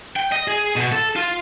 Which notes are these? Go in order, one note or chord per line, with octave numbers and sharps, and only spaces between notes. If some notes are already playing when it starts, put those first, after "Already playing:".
G5
D#5
G#4
B2
A4
F4